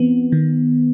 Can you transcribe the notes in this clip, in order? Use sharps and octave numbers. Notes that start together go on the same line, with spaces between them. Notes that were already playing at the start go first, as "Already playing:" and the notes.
Already playing: E3 B3 C4
D#3